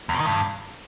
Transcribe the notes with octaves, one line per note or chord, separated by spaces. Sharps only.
E2
B2
D#3
G2